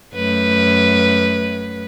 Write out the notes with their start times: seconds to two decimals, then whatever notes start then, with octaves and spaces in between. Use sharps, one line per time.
0.15 F#2 A3 B4